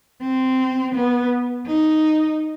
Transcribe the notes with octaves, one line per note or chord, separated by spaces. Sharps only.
C4
B3
D#4